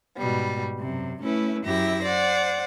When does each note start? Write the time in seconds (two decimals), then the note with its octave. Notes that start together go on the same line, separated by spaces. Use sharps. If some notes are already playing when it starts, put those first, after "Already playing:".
0.17 G#2 B2 G3
0.80 F#2 C3
1.22 A3 C#4 E4 B4
1.64 F#2 E4 G4 E5 A#6
2.04 C5 D5 F#5